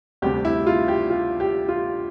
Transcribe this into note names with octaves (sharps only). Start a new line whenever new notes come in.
D2 C3 G3 G4
E4
F4
G4
F4
G4
F4